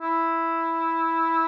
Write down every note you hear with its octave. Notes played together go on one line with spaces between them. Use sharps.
E4